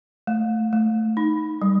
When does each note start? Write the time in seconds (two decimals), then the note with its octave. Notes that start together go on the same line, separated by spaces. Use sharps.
0.27 A3
0.73 A3
1.17 D#4
1.62 G3